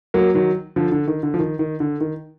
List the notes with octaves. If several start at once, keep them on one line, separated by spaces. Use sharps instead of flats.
F#3 A#3
D#3 F#3
D3 F3
D3
D#3
D3
F3
D#3
D#3
D3
D#3